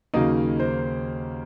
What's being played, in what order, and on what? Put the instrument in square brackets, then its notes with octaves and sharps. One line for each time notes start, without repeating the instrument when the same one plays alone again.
[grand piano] D#2 C#3 F#3 A#3 D#4 D#5
C5